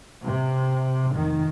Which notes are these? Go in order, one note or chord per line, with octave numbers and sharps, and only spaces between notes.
C3
F1 D#3